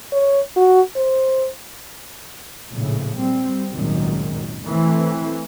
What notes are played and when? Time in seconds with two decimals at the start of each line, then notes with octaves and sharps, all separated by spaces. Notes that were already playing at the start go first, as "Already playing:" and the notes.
0.12 C#5
0.56 F#4
0.96 C5
2.72 A#1 A2 C#3
3.18 G3 C4
3.72 G#1 C#2 F#2 A#2 D#3
4.68 E3 A3 C4